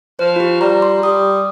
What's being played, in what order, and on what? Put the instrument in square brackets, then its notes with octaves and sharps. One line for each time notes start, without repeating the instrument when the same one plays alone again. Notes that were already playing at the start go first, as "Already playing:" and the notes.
[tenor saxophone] F3 [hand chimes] C5
[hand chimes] F4
G4
[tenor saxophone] G3 [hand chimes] A#5
[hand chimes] C6
[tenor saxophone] G3 [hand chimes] D#6